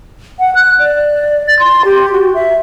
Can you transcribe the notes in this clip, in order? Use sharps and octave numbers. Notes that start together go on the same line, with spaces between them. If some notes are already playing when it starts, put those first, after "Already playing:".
F#5
F#6
D5
A6
C6
G4
F#4
E5